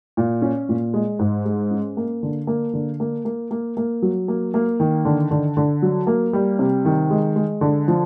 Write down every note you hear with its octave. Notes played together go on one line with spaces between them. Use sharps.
A#2
C#4
A#2
G#3
G#2
G#3
C#4
A#3
D3
A#3
D3
A#3
A#3
A#3
A#3
F#3
A#3
A#3
D#3
D3
D3
D3
F#3
A#3
G3
C3
D#3
G#3
G#3
D3
F3